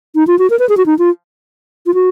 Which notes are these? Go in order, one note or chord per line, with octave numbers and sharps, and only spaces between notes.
D#4
F4
F#4
A#4
B4
G#4
F#4
D#4
F4
F4
F#4